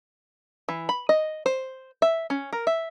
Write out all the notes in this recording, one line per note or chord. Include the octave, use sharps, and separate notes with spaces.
E3
B5
D#5
C5
E5
C#4
A#4
E5